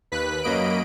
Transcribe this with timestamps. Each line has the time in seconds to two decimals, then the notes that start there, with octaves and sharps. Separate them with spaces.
0.12 D#2 B4 F#6 B6
0.43 F#2 F#3 A#3 D#5 B5 D7